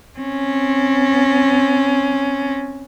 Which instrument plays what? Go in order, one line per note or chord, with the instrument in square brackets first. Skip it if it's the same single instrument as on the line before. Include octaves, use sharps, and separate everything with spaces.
[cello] C4 C#4